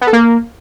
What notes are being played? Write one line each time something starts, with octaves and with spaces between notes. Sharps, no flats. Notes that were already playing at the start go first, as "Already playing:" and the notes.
B3
A4
A#3